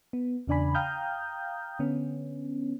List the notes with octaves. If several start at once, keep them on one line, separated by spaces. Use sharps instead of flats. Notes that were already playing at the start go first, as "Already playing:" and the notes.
B3
E2 C#3 D4 D5 G#5 B5
F5 G5 A#5 D#6 F6 G6
D3 B3 C#4